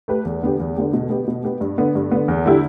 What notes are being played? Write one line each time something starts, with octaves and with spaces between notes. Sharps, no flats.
A3 G4 B4
E2
D3 B3 G4
E2
D3 B3 G4
B2
B3 G4
B2
B3 G4
G2
D3 B3
G2
D3 B3
E2
D3 G3 E4 G4